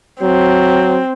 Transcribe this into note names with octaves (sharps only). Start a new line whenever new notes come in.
F#3 C4